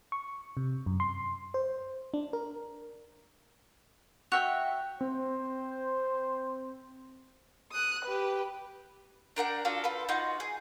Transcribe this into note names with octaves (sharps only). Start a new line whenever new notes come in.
C#6
C3
F#2
C6
C5
D4
A#4
F#4 E5 G5 F#6 F7
C4 C5
D#6 F#6
G4 B4
D4 A#4 F#5 G5
D4 F4 F#4 A4
F4 A4 B4
D#4 F4 F#4 F#5
G#4